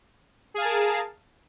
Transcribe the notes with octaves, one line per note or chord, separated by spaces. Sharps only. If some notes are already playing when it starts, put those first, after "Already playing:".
G#4 A#4 F5 A5